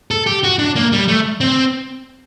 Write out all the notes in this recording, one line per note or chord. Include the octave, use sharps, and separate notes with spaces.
A4
G4
F#4
D4
A#3
G3
A3
C4